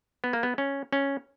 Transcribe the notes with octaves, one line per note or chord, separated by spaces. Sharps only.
B3
A#3
B3
C#4
C#4